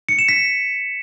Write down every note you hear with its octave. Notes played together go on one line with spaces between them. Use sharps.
C#7
E7
B6